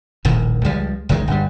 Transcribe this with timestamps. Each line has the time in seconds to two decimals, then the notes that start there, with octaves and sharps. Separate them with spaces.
0.25 D#1 A#1 A2 D#3
0.65 C#2 F3 G3 G#3
1.09 F#1 C#2 D#3 G#3
1.28 G1 G2 G3